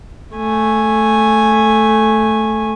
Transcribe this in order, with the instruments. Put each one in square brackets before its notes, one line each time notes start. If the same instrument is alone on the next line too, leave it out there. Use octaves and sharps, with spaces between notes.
[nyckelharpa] A3 G#5